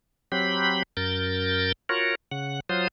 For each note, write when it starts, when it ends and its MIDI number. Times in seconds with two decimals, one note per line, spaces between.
0.32 0.83 54
0.32 0.83 60
0.32 0.83 67
0.32 0.83 83
0.97 1.72 42
0.97 1.72 70
0.97 1.72 91
0.97 1.72 93
1.89 2.15 65
1.89 2.15 66
1.89 2.15 70
1.89 2.15 73
2.31 2.60 49
2.31 2.60 78
2.69 2.88 54
2.69 2.88 65
2.69 2.88 72
2.69 2.88 87